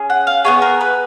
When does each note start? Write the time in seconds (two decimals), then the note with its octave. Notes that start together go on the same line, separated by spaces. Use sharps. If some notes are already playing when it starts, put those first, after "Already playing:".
Already playing: C#4 G#4
0.10 F#5
0.27 F5
0.44 B3 F4 G#4 C#5
0.62 A#4
0.81 B4